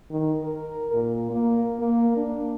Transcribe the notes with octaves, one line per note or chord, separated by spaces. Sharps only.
D#3
A#4
A#2
A#3
A#3
D4